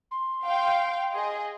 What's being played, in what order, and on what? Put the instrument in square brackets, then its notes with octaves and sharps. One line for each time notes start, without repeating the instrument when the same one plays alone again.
[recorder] C6
[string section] F5 G5
G#4 D#5